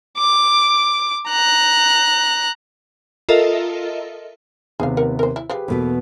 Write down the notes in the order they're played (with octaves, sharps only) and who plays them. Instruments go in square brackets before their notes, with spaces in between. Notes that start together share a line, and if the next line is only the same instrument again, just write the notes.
[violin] D6
A#5 F#6
[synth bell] F4 A4 A#4 D#5 E5
[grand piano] D#2 C3 B3 [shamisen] G#4 F5
[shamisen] A#4 F#5
A#4 C5
E4
[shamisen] F3 [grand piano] G4 G#4 B4
[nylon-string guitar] E2 B2 B3 [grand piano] A#3 A4 B4